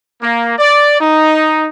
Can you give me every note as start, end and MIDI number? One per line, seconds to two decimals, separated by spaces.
0.22 0.55 58
0.58 1.00 74
1.00 1.69 63